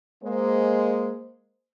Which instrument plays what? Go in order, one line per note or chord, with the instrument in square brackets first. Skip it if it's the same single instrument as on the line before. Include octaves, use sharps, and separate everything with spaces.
[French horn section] G#3 A#3 C5